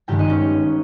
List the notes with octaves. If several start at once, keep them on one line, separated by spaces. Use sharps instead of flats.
G1 G2 D#3 G#3 G4 G5
D#4 D#5
C#4